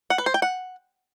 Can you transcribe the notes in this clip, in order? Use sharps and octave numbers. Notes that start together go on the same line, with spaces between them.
F#5
B4
C5
G5
F#5